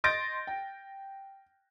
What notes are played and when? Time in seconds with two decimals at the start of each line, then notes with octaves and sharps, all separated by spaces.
0.04 D#5 C6 G6 A6 A#6 D7
0.47 G5